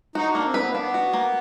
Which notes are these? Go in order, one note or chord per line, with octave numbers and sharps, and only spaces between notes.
D#4 F#4
D4
A#3
C4
B4
B3
A#3
B3 D4
F#4
A#3